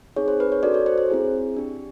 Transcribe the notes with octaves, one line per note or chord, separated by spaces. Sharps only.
C4 D#4 G#4 C#5
C5
B4
C#5
D4 F#4 A4 D5
C#5
C5
C5
C4 E4 G#4
D4 G4